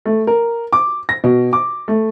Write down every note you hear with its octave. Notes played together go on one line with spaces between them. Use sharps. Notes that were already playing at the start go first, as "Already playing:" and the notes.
A3
A#4
D6
A#6
B2
D6
A3